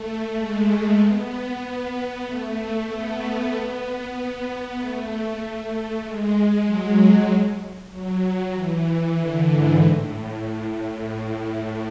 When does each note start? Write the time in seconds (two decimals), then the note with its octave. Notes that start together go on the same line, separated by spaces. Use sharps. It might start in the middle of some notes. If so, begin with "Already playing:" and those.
Already playing: A3
0.36 G#3
0.98 B3
2.25 A3
2.88 B3
4.77 A3
5.40 A3
6.02 G#3
6.65 F#3
7.90 F#3
8.22 F#3
8.53 E3
9.17 D3
9.48 G#2
9.80 A2
10.43 A2
11.06 A2
11.36 A2